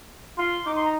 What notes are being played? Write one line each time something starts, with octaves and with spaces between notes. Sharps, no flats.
F4 C6
D#4 D6
C6
A#5